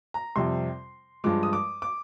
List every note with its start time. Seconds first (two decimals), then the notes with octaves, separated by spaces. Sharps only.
0.14 A#5
0.36 F2 C3 G3 C6
1.24 G2 F3 G#3 D6
1.43 D#6
1.53 D6
1.82 D6